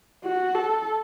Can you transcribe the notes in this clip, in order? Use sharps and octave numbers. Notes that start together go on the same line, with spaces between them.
F#4
A4